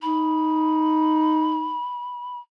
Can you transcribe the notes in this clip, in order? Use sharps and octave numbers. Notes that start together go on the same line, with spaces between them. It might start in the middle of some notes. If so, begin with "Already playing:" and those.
D#4 B5